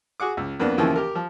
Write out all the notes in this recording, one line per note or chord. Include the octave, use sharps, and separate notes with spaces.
F#4 G#4 F#5 D6
C#2
F2 A#3 B3 D4
D#2 C#3 E3 F3 A#3
G4 A#4
F3